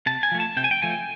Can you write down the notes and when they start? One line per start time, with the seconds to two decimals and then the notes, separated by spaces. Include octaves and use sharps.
0.06 C3 A5
0.23 G#5
0.31 F3 A3
0.40 A5
0.56 C3 G5
0.64 G#5
0.71 G5
0.82 F3 A3 G#5